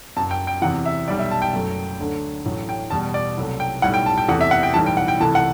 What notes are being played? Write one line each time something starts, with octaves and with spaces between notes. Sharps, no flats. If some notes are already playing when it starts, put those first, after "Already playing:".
F#1 F#2 F#3 A5
G5
G5
E2 C3 E3 F#5
E5
B1 B2 G3 D5
E5
A5
G5
F#1 F#2 F#3 A3
D2 D3 F#3 A3
A1 A2 F#3 A3
G5
E2 B2 G3 A5
D5
C2 C3 F#3 A3
G5
B1 A2 G3 F#5
G5
A5
G5
E2 C3 E3 A3 F#5
E5
F#5
G5
B1 A2 E3 G3 A5
G5
F#5
G5
C2 C3 E3 A3 A5
F#5